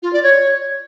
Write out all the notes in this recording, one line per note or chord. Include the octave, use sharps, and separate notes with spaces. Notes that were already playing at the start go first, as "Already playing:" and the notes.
F4
D5
C#5